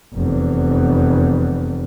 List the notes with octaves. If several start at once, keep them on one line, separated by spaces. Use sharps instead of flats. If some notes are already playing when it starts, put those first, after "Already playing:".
F1 E2